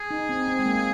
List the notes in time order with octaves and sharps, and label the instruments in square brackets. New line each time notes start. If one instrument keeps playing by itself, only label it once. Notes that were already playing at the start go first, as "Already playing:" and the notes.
Already playing: [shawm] G#4
[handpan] D#4
C4
C4
G#3
A#3